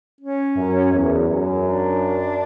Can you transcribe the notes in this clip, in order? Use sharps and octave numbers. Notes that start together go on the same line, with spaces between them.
C#4
F#2
E2
F#2
D4